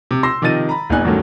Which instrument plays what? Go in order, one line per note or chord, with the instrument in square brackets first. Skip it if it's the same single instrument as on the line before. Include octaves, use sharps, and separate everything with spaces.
[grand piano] C3
C6 E6 A#6
C3 D#3 F3 D#5 A6 D#7
A#5 B5
F1 E2 A#2 D#4 G#5 F#6
D2 G2 D#3 F#3 A3 C#4